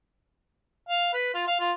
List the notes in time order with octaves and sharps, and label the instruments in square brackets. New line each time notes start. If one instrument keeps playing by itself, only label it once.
[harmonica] F5
B4
F4
F5
F4